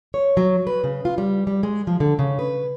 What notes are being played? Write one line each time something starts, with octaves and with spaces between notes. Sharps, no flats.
C#5
F#3
B4
C#3
F4
G3
G3
G#3
F3
D3
C#3
B4